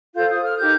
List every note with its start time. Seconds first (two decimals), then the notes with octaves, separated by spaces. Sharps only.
0.14 F4 A4 C5 G6
0.29 D#6
0.42 F6
0.56 D#4 G4 A#4 G6